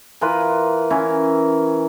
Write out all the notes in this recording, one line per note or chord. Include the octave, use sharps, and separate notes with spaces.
E3 F4 A#4 B4
E3 C#4 A#4